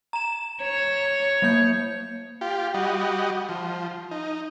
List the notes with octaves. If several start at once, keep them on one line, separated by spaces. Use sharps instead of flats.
A#5 E7
C#5
F#3 A#3 G6
F4 G4
G3 F#4 D#5
F3
D#4